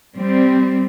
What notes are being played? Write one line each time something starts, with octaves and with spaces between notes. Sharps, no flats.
G3 C4